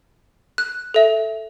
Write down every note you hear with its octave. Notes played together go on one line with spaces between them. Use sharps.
F#6
A4 E5